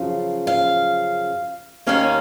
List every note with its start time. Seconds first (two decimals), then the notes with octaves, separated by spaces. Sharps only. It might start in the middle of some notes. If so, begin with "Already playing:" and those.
Already playing: F#2 C#3 F3
0.47 F5
1.87 D#2 D#3 A#3 C#4 F5